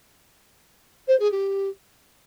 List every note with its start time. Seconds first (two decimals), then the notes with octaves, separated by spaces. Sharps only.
1.08 C5
1.19 G#4
1.31 G4